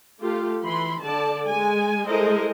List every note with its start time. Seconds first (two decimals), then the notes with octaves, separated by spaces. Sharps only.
0.21 A3 F4 G4 A4
0.64 E3 B5 C6
1.04 D3 D5 A5
1.47 G#3 G#5
2.06 G#3 E4 A4 A#4 C5 D#5